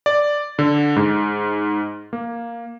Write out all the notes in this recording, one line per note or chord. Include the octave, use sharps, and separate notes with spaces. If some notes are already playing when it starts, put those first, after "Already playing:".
D5
D3
G#2
A#3